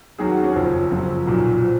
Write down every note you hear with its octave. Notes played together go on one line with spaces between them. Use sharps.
D#2 D#3 F#3 G#4
F#4
C#4
F#1 F2 F3
F#1 F#2 C#3 F3
B1 A#2 F#3
F3